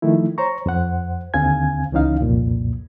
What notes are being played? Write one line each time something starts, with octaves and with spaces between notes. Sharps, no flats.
D#3 F3 A3 E4
C5 C#5 A#5 C#6
F2 C5 F#5
D#2 D3 C4 F5 G#5 G#6
C#2 E3 C#4 D#4 F5
C2 F2 A#2